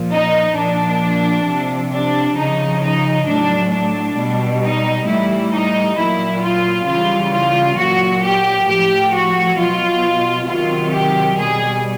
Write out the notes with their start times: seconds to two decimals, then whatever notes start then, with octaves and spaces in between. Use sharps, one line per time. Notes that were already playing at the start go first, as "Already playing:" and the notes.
Already playing: A#2 F3
0.11 D#4
0.56 A#2 F3 D4
1.46 C3 F3
1.91 D4
2.36 C#3 F3 D#4
2.81 D#4
3.26 A2 F#3 D4
3.72 D4
4.17 B2 G3
4.61 D#4
5.06 A2 E3 G3 E4
5.52 D#4
5.96 A#2 F#3 E4
6.42 F4
6.86 C#3 E3 G3 F4
7.32 F4
7.77 A#2 F#3 F#4
8.22 G4
8.67 A2 F3 G4
9.13 F#4
9.57 B2 F#3 F4
10.47 C3 D#3 F#3 F4
10.92 G4
11.37 B2 G3 G#4